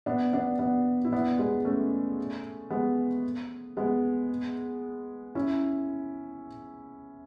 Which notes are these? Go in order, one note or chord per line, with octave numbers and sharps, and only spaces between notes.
B3 D4
B3 D4
B3 D4
E4
B3 D4
G#3 B3
A3 C#4
G#3 B3
G#3 B3
C#4 E4